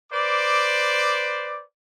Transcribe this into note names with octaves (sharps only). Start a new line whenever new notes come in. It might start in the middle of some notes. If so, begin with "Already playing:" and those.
B4 C5 D5 D6